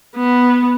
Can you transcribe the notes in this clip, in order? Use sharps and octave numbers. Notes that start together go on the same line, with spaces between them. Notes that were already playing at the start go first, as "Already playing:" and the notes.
B3